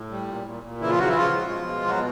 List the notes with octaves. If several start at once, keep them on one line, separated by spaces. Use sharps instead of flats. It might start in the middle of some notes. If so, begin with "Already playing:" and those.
Already playing: A2
G3
A#2
A#2
A#2
C#3 E3 E4
F3 F4
C#3 F#3 F#4
E3 E4
C#3 F3 F4
G#3
B2
G#3
B2 F#3 F#4